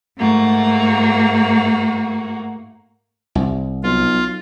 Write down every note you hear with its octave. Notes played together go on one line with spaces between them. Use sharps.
G#2 A3 A#3 F#4
C2
B1 F4